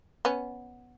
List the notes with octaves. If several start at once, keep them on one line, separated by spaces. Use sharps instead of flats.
B3 C#4